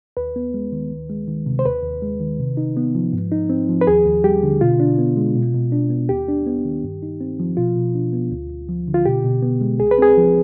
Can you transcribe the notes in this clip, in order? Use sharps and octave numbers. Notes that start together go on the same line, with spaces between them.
D#2 B4
B3
G#3
D#3
D2
G#3
D#3
C3
C5
D#2 B4
D#2
G#3
D#3
C3
D#4
B3
F3
G#2
D#4
C4
F3
B4
D#2 G#4
D#2
G3 G4
D3
B2 F4
D4
B3
G#3
B2
B2
D4
B3
D#2 G4
D4
B3
D#3
G2
D#4
C4
F3
B2 F4
B2
D4
B3
D2
D2
F3
D3
F4
B2 G4
B2
B3
G#3
C2 G#4
B4
C4 G#4
F3